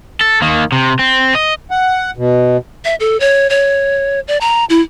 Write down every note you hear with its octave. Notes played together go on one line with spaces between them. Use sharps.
A4
D#3 A#3
C3
C4
D#5
F#5
B2
E5
A4
C#5
C#5
D5
A#5
E4